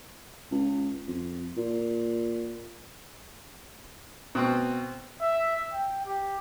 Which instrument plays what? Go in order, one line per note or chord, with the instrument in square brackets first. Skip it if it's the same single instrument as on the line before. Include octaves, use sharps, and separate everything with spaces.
[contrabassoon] C#2
F2
A#2
[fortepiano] B2 C4
[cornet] E5
G5
G4